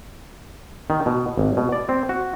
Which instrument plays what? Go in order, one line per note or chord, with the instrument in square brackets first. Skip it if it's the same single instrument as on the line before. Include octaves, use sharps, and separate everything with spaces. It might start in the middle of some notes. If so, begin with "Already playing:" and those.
[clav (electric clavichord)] D#3
B2
G#1
B2
D5
C4
F#4